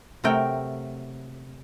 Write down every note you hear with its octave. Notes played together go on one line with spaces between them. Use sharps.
C3 F#3 A3 A#4 G5